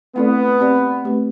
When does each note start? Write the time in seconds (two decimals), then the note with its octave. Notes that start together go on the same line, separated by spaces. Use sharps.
0.16 A3 B3 C4 E4 A4 D5
0.60 C4 G4 D5
1.05 A3 C4 G4 B4